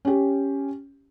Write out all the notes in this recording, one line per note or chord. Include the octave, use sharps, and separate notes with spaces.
C#4 G4